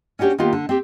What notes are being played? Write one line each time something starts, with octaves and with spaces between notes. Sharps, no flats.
C#4 D4 F#4 G4 C#5
D#3 A#3 B3 F4 G4
D3
C4 G4